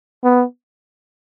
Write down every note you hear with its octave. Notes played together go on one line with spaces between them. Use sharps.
B3